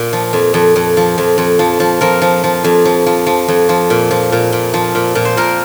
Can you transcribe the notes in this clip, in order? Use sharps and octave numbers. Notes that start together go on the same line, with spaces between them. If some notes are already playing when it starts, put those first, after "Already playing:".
Already playing: A#2
F3
F2
F2
F2
F3
F2
F2
F3
F3
F3 A#4
F3
F3
F2
F3
F3
F3
F2
F3
A#2
F3
A#2
A#2
F3
A#2
A#2
C5
A#2 A#4